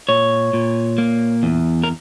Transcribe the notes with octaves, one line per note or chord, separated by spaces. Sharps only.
A#2 C#5
A#2
A#3
E2
A#4